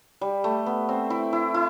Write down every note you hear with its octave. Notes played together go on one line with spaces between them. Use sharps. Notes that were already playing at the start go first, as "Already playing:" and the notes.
G3
A3
B3
C4
E4
E4
E4